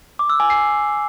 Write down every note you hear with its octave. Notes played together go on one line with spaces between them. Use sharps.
D6
E6
G#5
C7